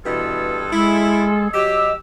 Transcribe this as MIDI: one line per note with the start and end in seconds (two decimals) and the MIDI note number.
0.06 0.67 43
0.06 0.67 47
0.06 0.67 52
0.06 1.48 65
0.06 1.48 68
0.06 1.48 69
0.73 1.48 56
0.73 1.26 64
1.53 1.93 54
1.53 1.93 67
1.53 1.92 75
1.53 1.94 88